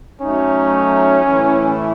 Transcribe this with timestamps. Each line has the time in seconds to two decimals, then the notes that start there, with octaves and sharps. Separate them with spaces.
0.21 F#3 A3 C#4 D#4
1.22 A2 E3 A3 E4